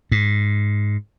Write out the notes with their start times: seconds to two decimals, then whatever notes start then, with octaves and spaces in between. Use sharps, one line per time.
0.12 G#2